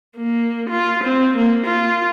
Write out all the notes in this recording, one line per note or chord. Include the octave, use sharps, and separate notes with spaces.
A#3
F4
C4
A#3
F4